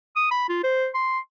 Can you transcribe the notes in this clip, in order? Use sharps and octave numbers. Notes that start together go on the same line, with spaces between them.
D#6
B5
F4
C5
C6